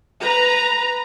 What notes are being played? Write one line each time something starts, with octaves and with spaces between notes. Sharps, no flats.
B4 A#5